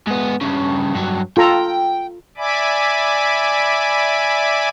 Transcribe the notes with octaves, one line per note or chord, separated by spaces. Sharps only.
G#2 B3
G2 C#3
G2 F#3
F4 A4 G5 A#5
D5 E5 G#5 B5 D6